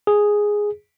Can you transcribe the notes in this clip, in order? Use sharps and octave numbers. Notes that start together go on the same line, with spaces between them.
G#4